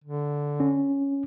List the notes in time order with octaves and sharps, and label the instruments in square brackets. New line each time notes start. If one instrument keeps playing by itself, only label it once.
[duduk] D3
[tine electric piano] C#4